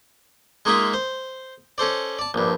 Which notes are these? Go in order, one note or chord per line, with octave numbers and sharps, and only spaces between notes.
G#3 A#3 D#4 F4 G#4 E5
C5
C#4 A4 C5 D5
D5 A5
A#1 G2